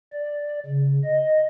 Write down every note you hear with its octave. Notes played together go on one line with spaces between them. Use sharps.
D5
C#3
D#5